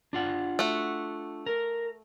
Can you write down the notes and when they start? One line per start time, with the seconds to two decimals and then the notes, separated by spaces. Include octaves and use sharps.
0.13 D4 F4 F#5
0.59 A3 F#4
1.46 A#4